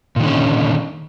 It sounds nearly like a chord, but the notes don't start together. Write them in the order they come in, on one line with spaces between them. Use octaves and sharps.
A#2 D#3 D3 C#4